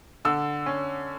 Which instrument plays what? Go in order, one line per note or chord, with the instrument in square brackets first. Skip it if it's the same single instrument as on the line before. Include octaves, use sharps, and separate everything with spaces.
[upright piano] D3 E6
C#4